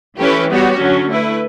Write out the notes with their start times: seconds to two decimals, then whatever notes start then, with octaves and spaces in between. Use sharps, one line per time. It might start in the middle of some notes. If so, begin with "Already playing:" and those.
0.19 E3 A3 C#4 G4 B4
0.50 G3 B3 F#4 C#5
0.80 D3 F#3 C#4
1.09 A3 E4 B4